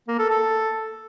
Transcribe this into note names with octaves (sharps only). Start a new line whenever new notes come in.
A#3
A4
A4